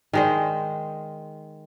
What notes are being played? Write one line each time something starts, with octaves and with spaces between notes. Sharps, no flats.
D#3 G#3 C5